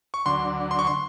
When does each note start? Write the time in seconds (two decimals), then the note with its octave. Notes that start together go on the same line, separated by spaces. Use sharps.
0.14 C#6
0.26 D2 D3 F#3 C6
0.71 C6
0.79 C#6
0.87 C6